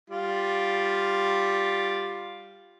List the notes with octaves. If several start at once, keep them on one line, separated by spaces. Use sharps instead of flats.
G3 F4